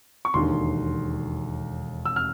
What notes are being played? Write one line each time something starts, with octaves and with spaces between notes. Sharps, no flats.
C#6
E1 D#2 D3 C6
E6
F6